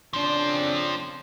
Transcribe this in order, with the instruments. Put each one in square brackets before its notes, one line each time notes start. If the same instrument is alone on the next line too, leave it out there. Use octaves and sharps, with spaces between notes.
[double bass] C#3 D4 [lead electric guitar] F3 C4